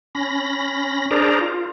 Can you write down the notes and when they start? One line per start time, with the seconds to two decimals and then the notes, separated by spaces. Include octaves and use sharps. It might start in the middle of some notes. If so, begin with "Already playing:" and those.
0.15 C#4 B5 A#6
1.11 D4 G#4 A#4 C5 D5 A#5
1.41 F4